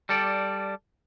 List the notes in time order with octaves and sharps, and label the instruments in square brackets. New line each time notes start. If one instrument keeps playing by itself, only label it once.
[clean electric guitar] G3 A4 D5